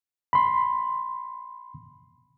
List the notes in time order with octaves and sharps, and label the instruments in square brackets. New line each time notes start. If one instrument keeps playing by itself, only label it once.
[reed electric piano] B5 C6